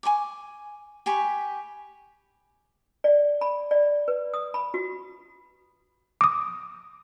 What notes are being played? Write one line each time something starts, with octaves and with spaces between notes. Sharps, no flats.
G#5 B5 C#6 D6
G4 G#5 B5 C#6
D5
B5
D5
B4
D#6
B5
F#4
D6 D#6